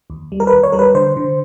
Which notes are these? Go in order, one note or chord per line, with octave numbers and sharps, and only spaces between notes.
D#2
G3
A#4
B4
D#2
C#5
G3 A#4
B4
D3 C5
D3